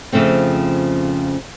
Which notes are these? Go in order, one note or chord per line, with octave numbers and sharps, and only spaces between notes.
F2 C#3 F3 A3 C4